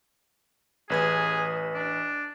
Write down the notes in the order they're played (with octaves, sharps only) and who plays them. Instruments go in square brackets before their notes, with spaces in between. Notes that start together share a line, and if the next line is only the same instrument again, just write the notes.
[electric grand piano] A1 B4 G#6 [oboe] G#4
[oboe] D4